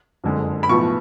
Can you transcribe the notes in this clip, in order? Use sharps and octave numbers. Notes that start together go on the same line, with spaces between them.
F#1 F2 D3 G#3
B5
B1 A2 F3 B3 C#6